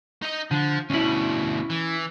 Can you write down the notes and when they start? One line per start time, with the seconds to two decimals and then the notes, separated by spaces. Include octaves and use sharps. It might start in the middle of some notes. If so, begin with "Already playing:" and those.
0.22 D#4 D#5
0.51 D3 F3
0.90 D2 B2 C#4 E4
1.70 E3